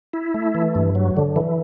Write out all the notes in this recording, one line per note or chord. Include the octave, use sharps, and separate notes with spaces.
E4
A3
E3
G2
F#3
D3
E3